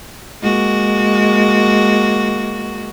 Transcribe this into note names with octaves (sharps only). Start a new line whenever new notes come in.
G#3 A#3 F#4